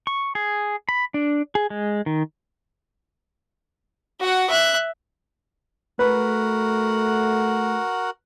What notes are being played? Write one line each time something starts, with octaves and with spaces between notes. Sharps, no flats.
C#6
G#4
B5
D4
G#4
G#3
D#3
F#4 F#5
E5 F#6
A3 F#4 A#4 B4 F#5